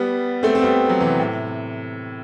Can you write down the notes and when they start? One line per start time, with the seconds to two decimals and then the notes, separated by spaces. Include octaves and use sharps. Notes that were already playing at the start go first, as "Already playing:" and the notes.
Already playing: G3 B3
0.43 A3 C4
0.55 C4
0.62 G3 B3
0.89 F#3
1.00 C3 E3
1.20 A2 C3